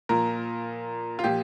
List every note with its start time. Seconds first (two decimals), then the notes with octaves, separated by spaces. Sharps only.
0.09 A#2 F3 A#4
1.19 F4
1.24 A#2 F3 G4